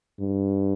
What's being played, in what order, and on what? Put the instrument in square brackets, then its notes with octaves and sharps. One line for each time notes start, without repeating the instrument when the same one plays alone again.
[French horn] G2